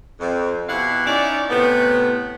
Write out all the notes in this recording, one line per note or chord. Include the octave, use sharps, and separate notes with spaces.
F2
B2 E4 G4 F5 F#5
C#4 D#4 E4 D5
A2 C3 B3